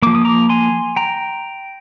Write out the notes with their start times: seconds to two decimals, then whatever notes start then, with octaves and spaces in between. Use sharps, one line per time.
0.02 F3 A#3 D6
0.15 D#6
0.25 A#5 D6
0.49 G#5 C6
0.96 G5 A#5